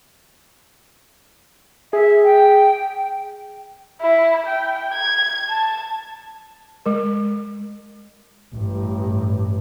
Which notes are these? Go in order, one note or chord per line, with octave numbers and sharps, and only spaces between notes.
G#4 E5
G5
E4
G5
G#6
A5
G#3 A#4
A1 G2